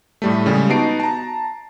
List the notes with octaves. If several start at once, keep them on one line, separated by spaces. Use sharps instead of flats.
A2 G3 A3
C#3 G3 G#3
B3 D#4 F#4 A5 C7 D7
A5 A#5